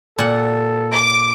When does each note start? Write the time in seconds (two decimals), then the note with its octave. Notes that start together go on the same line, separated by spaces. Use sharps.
0.18 A#2 A4 F#5
0.93 D6